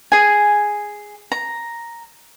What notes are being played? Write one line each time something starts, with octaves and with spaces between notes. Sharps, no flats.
G#4 G#5
A#5